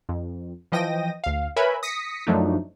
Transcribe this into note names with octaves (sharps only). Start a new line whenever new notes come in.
F2
E3 F3 D#5 G5 A#6 D#7
D2 F5
A#4 B4 C#5 E5 G#5 B5
D#6 A#6 B6 C#7
F#2 F3 F#3 A3 D4 D#4